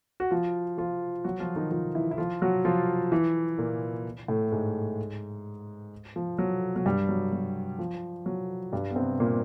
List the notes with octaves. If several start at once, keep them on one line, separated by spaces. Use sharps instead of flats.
F#4
F3 F4
F3 F4
F#3 F#4
F3 F4
D#3 D#4
F3 F4
E3 E4
E4
F3 F4
F#3 F#4
F3 F4
E3 E4
A#2 A#3
A2 A3
G#2 G#3
F3
F#3
F#3
G2 G3
F#3
F#3
F3
F#3
G2 G3
B3
C3 C4
A#2 A#3